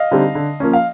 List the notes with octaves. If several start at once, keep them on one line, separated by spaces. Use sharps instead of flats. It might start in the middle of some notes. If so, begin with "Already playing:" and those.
Already playing: D#5 F5
D3 G3 C4 D#4
D3
F3 A#3 C#4
F5